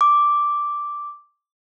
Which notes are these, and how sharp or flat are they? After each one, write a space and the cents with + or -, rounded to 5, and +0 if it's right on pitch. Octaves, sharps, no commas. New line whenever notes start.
D6 -5